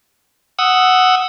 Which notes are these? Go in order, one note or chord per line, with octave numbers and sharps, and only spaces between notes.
F#5 D#6 E6